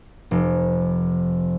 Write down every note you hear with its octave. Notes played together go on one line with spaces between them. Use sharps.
F1